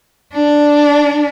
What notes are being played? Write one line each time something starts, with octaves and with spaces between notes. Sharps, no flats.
D4